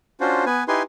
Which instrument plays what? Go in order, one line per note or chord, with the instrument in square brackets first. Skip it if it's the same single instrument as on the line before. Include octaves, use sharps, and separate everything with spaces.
[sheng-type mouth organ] C#4 D4 F4 F#4 C5
B3 B4 G#5
D#4 E4 G4 B4 G#5 C6